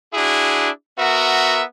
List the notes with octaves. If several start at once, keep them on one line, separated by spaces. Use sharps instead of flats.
D4 E4 F#4 G#4
B3 F#4 A#4 E5